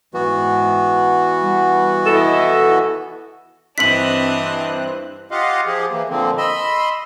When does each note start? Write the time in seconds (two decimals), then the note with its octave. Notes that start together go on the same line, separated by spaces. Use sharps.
0.14 G#2 E3 B3 F#4
1.39 G3
2.06 E4 A4 D#5
3.78 G2 E3 C4 D4 D#5 F#6 B6 F#7
5.31 F4 G4 D#5 F5 F#5
5.66 F3 G4 G#4
5.90 E3 A#3
6.10 A#2 D3 F3 A#3 C4
6.38 D#5 B5 C6 E6